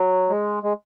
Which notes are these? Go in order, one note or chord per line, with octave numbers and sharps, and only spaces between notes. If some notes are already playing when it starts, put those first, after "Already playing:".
Already playing: F#3
G#3
G#3